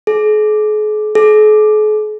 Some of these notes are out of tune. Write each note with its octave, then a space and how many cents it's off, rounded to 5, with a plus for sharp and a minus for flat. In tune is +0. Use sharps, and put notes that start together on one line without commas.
G#4 +40
G#4 +45